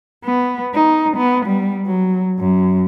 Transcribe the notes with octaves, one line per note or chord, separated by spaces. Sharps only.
B3
D#4
B3
G3
F#3
F#2